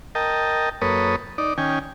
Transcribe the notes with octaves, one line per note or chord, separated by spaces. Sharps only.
A#4 D#5 G5 A5
F#2 A#3 A4 B4 C#5 D#6
D#4 D5
D#3 C#4 G5 G#5